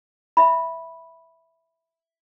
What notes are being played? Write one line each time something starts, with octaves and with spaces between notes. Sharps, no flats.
E5 B5